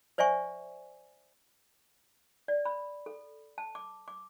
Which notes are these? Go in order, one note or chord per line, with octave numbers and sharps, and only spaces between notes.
C5 D5 E5 G#5 C#6
D5
B5
A4
A5
D6
D6